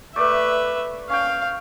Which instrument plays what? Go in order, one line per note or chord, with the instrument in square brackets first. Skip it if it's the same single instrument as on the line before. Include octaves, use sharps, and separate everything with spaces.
[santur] A3 D5 [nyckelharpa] B4 E5
[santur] C#4 G5 [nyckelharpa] F5